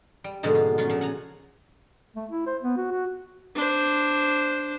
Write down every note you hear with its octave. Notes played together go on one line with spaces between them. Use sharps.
G3
G#2 B2 D3 F3 G#3 A#3
F4
C#3 F#3 F4
A#2 F3
F#5 G#5 A#5
A3
E4
C5
B3
F#4
F#4
D4 C5